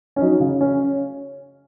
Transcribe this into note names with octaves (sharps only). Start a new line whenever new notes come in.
C#4
F#3 D#4
C#3
C#4